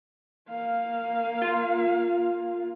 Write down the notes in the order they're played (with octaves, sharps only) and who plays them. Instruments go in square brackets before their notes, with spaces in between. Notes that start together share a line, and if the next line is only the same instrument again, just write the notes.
[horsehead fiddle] A#3 F5
[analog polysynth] F4